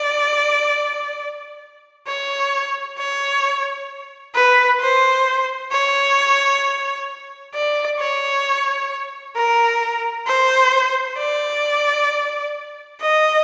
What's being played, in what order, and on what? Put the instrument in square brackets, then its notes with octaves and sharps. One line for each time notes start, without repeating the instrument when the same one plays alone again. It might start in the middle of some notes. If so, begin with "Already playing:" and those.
Already playing: [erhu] D5
C#5
C#5
B4
C5
C#5
D5
C#5
A#4
C5
D5
D#5